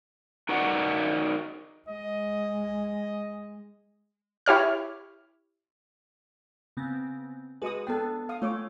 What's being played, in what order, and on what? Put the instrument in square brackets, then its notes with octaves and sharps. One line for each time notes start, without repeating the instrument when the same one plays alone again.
[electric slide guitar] D#4 F#4 A#4 D5 D#5 F#5
[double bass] G#3 [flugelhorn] D#5
[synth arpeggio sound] E4 G4 C#5 F6
[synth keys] C#3 B3 C4
[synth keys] G#3 F#4 B4 [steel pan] G#4 D#5 D#6
[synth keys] B3 D4 [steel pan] A4 G5
[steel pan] F5 D#6
[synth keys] A3 [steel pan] F4 C#5 D6